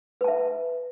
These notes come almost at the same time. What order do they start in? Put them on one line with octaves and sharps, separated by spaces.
B4 A5 E5